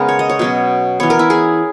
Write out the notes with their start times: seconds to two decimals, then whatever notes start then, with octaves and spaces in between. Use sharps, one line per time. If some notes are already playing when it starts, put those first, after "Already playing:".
Already playing: C#3 G#3 B3 A#4
0.09 C#5
0.19 D#5
0.29 C#5
0.39 B2 F#3 C#4
1.00 E3 B3 C#5
1.10 A#4
1.19 E4
1.30 G#4